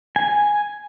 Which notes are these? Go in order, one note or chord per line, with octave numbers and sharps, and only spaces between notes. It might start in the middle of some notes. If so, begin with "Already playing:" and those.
G#5